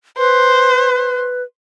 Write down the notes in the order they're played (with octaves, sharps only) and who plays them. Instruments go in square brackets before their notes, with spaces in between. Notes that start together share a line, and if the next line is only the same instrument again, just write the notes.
[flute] B4 [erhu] C5